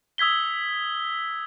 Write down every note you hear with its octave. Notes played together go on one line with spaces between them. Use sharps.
D#6 E6 G#6 B6 G7